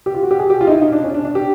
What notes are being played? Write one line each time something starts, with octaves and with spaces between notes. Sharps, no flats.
G4
F4
F#4
G4
G#4
G4
F4
D#4
E4
D#4
D4
C#4
D4
D4
G4